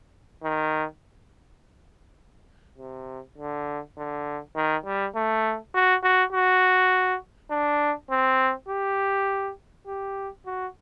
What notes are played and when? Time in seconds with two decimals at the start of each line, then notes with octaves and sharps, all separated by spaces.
0.43 D#3
2.78 C3
3.38 D3
3.98 D3
4.56 D#3
4.86 G3
5.15 A3
5.75 F#4
6.03 F#4
6.33 F#4
7.51 D4
8.11 C4
8.69 G4
9.87 G4
10.46 F#4